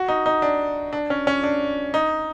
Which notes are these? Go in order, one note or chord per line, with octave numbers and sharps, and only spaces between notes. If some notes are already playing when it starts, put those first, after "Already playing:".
Already playing: F#4
D#4
D#4
D4
D4
C#4
C#4
D4
D#4